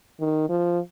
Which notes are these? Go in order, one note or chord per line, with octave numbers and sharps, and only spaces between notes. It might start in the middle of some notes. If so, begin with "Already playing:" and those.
D#3
F3